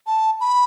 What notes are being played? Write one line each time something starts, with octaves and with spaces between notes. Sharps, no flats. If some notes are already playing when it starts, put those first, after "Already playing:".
A5
B5